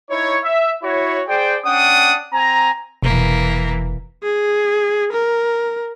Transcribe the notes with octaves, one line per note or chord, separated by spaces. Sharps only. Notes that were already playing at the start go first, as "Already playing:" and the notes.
D#4 E4 C#5
E5
E4 F#4 C#5
G#4 C5 D5 G5
C#4 D4 F#5 G5 D#6
C4 G#5 A#5
F1 B2 E3 A#3
G#4
A#4